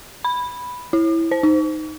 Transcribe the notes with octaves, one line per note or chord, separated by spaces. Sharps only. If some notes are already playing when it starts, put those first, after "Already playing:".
B5
E4
C5
D#4